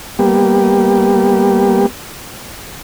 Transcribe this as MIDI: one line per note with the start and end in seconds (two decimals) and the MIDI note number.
0.19 1.86 55
0.19 1.86 58
0.19 1.86 59
0.19 1.86 67